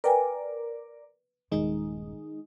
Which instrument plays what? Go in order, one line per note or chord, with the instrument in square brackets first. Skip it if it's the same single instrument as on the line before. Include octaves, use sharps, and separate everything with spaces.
[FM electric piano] A#4 D5 [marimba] B4 G5 G#5
[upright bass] D#1 G2 [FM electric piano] D#3 G#3 D#4